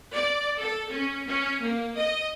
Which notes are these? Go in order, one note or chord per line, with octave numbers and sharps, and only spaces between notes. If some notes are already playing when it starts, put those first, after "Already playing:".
D5
A4
C#4
C#4
A#3
D#5